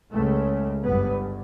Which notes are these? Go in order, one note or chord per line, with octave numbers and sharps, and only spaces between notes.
C#2 C#3 A3
G1 G2 B3